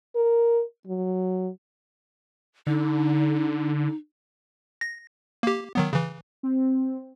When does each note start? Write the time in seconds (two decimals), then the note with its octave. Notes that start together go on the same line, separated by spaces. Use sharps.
0.15 A#4
0.87 F#3
2.67 D3 D#4
4.81 A#6
5.43 A#3 G4
5.75 D#3 F#3 B3
5.93 C#3 E3
6.43 C4